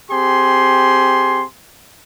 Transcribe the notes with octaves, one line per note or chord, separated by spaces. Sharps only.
C4 G4 G#4 C6